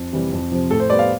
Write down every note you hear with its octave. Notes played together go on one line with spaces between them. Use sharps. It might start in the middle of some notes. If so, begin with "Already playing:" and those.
Already playing: F2
C3 E3 G3
F2
C3 F3
A2 A4
C5
G3 B3 D5
F5